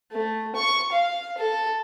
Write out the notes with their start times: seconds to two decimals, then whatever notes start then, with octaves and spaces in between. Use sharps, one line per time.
0.12 A3
0.56 C#6
0.92 F5
1.38 A4